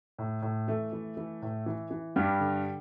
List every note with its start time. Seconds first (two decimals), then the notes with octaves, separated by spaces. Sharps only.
0.19 A2
0.42 A2
0.68 E3 A3
0.93 E3
1.17 E3
1.42 A2
1.66 E3
1.91 E3
2.16 G2 G3
2.40 D3